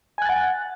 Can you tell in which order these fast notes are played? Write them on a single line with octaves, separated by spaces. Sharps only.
G#5 F#6 A6 F#5